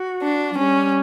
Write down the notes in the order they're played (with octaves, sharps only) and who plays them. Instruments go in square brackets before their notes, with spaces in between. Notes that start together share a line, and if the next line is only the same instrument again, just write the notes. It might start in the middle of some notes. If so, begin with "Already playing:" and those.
Already playing: [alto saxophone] F#4
[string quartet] D4
[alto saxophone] F#3
[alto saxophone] G3 [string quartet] C#4